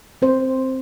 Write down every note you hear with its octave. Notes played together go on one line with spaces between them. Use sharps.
C4 C5